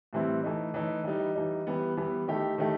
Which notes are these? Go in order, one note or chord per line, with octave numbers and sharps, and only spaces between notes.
A2 E3 G3 C4 E4
E3 A3 D#4
E3 A3 D#4
E3 G3 D#4
E3 G3 D#4
E3 G3 B3
E3 G3 B3
D#3 A3 E4 G4
D#3 A3 E4 G4